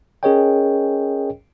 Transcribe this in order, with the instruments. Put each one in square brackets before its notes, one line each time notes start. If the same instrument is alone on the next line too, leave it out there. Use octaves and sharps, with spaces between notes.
[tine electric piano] C#4 G#4 A#4 C#5 D#5 G5